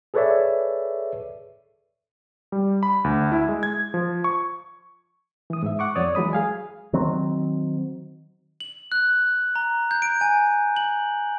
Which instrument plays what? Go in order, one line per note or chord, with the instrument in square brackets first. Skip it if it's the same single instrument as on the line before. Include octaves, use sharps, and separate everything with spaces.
[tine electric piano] G#4 A4 B4 C#5 D5 E5
[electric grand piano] G3
B5
D2
E4
G#3
G#6
F3
C#6
[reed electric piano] E3 D#6
G#2 E5
F#5 C#6 D6
F2 C#5 D5 D#6
E3 F#3 G#3 B5 D#6
G#4 F5 G#5
[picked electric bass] D#3 F#3 C4
[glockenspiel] F#7
F#6
A#5
G6
D7
G#5
F#7